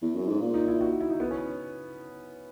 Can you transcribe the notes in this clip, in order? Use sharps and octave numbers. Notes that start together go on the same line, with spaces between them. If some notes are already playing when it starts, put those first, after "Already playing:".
E2
F#2
G#2
A#2
D#4
E4
F#4
E4
D#4
B3
C#4